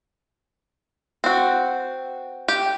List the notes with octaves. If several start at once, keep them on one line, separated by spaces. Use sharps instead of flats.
C4 F#4
G4